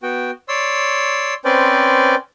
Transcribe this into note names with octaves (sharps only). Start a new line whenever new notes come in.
B3 F#4 G5
C#5 D5 C6 E6
C4 C#4 B4 C5 D5